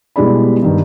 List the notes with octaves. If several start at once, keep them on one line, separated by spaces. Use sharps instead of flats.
B2 G3 G#3 E4 D5 B5
G2 D#3